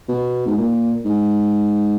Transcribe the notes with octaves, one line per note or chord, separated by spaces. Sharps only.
B2
G#2
A#2
G#2